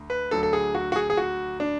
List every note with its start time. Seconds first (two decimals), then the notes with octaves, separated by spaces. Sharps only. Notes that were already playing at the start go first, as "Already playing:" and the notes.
Already playing: D2
0.10 B4
0.31 D2 D3 F#3 A4
0.43 A4
0.53 G#4
0.75 F#4
0.92 F#4
0.96 G#4
1.10 G#4
1.17 F#4
1.60 D4